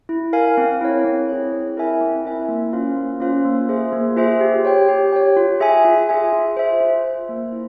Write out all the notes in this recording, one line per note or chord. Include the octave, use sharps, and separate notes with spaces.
E4
A#4 F5 G#5
C4
E4 G#4 C#5
C4
E4 G#4 C#5
C4
E4 A#4 E5 G#5
C4
E4 A#4 E5 G#5
A#3
C#4 F4 C5 F5
A#3
C#4 F4 C5 F5
A#3
F4 G#4 C5 E5
A#3
F4 G#4 C5 E5
G4
C#5 G5
G4
C#5 G5
F4
G#4 E5 G#5
F4
G#4 E5 G#5
F4
C5 E5
F4
C5 E5
A#3
E4